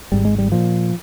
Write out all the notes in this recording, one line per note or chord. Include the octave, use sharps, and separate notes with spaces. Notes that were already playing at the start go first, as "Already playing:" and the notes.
G#1 G#2 G3
G#3
G3
A#2 F3